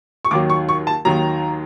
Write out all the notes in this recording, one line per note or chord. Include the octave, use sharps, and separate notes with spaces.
C#6
D#2 D#3 F#3 D6
C#6
C#6
A5
D#2 D#3 F#3 A#5